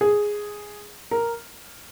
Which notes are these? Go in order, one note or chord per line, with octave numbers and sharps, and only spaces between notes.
G#4
A#4